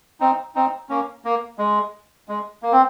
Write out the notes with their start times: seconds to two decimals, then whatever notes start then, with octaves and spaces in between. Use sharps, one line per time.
0.20 C4 D#4
0.55 C4 D#4
0.89 A#3 C#4
1.25 A#3
1.58 G#3
2.29 G#3
2.63 A#3
2.72 C4